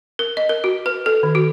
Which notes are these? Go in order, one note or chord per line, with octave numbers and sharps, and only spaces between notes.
A#4
D#5
A#4
F#4
B4
A4
D#3
F#4